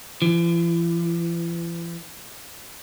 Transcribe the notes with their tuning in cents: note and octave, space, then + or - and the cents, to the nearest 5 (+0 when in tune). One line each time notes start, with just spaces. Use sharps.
E3 +45